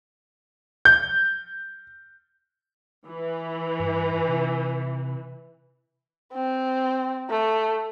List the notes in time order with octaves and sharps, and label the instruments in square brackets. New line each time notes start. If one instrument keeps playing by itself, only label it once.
[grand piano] G6
[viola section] E3
[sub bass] G2
C3
[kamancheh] C4
A3